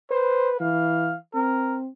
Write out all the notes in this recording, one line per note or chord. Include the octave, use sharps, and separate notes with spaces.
B4 C5
E3 F5
C4 A#4